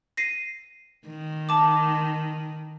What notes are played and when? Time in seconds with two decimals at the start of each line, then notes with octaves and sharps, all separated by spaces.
0.17 A#6 C7 D#7
1.07 D#3
1.49 A5 D6